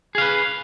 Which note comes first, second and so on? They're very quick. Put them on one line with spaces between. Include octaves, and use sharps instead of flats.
G#4 F5 B4